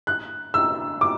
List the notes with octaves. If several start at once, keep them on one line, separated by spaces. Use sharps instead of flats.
F#6
E6
D6